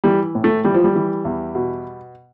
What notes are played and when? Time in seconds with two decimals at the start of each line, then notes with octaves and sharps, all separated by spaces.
0.04 E3 G3
0.35 A2
0.44 A3
0.64 E3 G3
0.74 F3
0.84 G3
0.95 E3
1.25 E2
1.55 B2